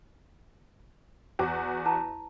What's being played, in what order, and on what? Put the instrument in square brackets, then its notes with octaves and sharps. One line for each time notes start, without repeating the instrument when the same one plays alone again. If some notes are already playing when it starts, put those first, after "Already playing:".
[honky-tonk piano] E2 F#4 D6
[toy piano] E4 A5 A#5